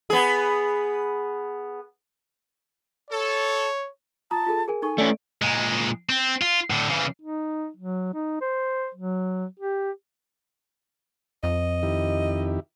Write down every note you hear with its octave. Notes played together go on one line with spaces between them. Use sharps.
B3 G#4
A4 C#5
F4 A5 A#5 D#6
F4 G#4 A4
G#4 A#4 G#5
D#4 A4 G#5 C#6
A3 C#4 D5 D7
A#2 G#3
C4
F4
A2 D3
C#3 E3
D#4
F#3
D#4
C5
F#3
G4
F2 D#5
D#3 E4 G4